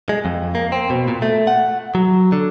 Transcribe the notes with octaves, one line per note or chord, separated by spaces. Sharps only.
G#3
F2
A#3
C4
B2
A#2
A3
F#5
F#3
D3